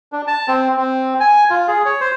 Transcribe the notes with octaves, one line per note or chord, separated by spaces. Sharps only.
D4
A5
C4
C4
G#5
F4
G#4
C#5
C5